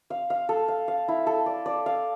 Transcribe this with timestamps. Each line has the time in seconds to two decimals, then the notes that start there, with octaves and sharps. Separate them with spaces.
0.10 F5
0.30 F5
0.49 A4
0.68 F5
0.88 F5
1.08 E4
1.27 A4
1.46 D5
1.66 D5
1.86 F5